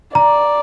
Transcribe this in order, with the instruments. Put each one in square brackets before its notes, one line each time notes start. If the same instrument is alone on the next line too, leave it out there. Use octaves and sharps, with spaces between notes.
[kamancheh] D5 [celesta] A#5